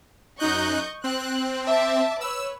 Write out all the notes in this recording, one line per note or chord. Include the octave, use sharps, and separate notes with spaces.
F#2 D#4 D#5 C#6 F#6 G6
C4 F#6
E5 A5 D6
B4 C#5 E6